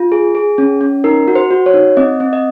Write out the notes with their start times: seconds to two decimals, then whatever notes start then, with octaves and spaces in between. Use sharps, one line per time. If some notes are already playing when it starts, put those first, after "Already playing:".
Already playing: F4
0.12 G#4
0.35 G#4
0.58 C#4
0.81 C#4
1.04 D#4 A#4
1.28 F#4
1.35 C5
1.51 F#4
1.66 C#5
1.74 D#4
1.97 C4 D#5
2.20 C4
2.33 D#5